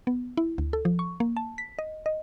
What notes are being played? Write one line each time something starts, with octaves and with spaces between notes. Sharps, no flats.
B3
E4
D2
A4
F3
C#6
A#3
A5
B6
D#5
D#5